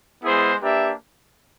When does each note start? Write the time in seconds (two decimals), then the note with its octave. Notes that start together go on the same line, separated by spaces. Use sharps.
0.23 G#3 B3 E4 G#4 C5
0.61 A#3 D4 G4 B4 E5